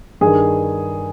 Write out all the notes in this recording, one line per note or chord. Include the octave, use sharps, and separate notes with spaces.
G2 D#3 G#4